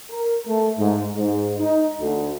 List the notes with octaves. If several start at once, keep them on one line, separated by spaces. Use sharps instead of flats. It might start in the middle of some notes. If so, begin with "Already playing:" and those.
A#4
A3
G#2
G#2
D#4
D2